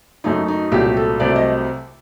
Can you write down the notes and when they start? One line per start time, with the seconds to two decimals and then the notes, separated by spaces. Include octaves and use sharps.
0.24 F#2 F#3 A3 D#4
0.48 D#4
0.72 C2 A#2 F#3 A3 G4
0.97 A4
1.20 C2 C3 F#3 A3 D5
1.36 D#5